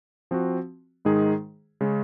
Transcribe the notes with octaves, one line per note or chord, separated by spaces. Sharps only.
F3 C4 F#4
G#2 D#3 G#3 D#4 G#4
C#3 G#3 C#4